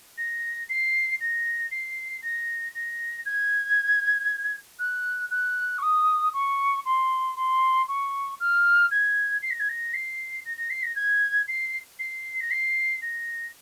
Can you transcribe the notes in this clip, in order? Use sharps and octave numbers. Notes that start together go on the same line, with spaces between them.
A#6
C7
A#6
C7
A#6
A#6
G#6
F#6
F#6
C#6
D#6
C#6
C6
C6
C#6
F6
G#6
C7
A#6
G#6
A#6
C7
A#6
A#6
C7
A#6
G#6
C7
C7
A#6
C7
A#6